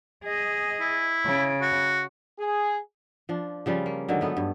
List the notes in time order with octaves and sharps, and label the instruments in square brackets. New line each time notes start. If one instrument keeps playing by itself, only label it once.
[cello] G#4 D#5
[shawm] E4
[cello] C#3
[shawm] F#4
[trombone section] G#4
[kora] F3 D4
C#3 F3 G3 C#4
A#3
D3 D#3 F#3 G#3
A3 B3 D#4 A4
G2